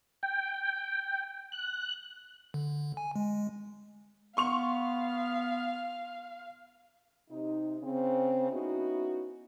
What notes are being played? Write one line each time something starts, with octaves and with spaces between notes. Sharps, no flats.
G5
F#6
D3
G#5
G#3
B3 F5 C6 C#6 F7
C3 D#4
C#3 C4
B3 C#4 D#4 E4 F#4